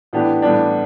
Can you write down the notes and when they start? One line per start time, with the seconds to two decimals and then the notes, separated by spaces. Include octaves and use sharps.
0.13 A2 E3 B3 D4 G4
0.42 A2 E3 G3 B3 D4